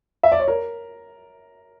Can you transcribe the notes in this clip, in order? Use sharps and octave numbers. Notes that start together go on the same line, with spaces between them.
E5
D5
C#5
A#4